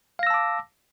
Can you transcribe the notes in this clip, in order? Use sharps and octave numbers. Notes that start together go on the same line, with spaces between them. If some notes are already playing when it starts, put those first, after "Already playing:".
F5 A5 D6 E6 A#6